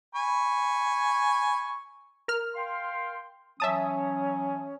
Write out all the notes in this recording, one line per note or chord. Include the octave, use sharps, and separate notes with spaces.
G#5 B5 C#6
A#4 F6
F5 G5 C6
E3 F#3 C#4 E5 A5 D#6